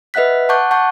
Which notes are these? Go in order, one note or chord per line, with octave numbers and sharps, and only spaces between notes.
B4 D#5 E5 F#5 F#6 B6
F#5 A5 C#6 D6 F#6 G6
F#5 A5 C#6 F#6 G6